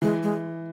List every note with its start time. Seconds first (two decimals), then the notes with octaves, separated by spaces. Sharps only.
0.02 E3 G#3
0.23 G#3